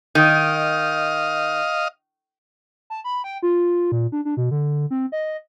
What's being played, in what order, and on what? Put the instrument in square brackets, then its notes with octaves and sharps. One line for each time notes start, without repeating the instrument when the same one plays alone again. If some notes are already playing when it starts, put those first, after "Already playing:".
[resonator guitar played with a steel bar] D#3 [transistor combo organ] D#5 F5
[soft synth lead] A5
B5
G5
F4
A#2
D4
D4
B2
D3
C4
D#5